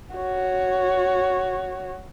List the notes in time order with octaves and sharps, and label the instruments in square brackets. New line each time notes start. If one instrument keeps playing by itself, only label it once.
[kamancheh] F#4 C#5